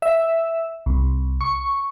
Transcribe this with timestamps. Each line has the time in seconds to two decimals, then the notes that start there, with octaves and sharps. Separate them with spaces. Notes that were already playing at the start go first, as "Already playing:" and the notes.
0.02 E5
0.86 C2
1.41 C#6